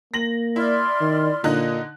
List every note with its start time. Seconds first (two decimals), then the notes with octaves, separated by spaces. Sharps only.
0.14 A#3 A#6 F#7
0.56 E4 D5 C6 F6
1.01 D#3
1.44 A#2 D3 D#4 F#6